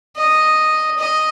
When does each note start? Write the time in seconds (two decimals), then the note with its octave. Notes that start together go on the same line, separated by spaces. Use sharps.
0.16 D#5
0.98 D#5